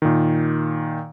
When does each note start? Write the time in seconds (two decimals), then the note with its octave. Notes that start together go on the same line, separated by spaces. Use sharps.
0.02 A#2 D#3